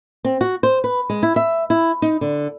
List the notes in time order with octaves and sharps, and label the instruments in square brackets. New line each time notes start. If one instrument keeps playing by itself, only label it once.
[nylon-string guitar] C4
F#4
C5
B4
G#3
E4
E5
E4
D#4
D3